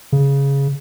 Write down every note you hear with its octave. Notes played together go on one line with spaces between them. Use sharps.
C#3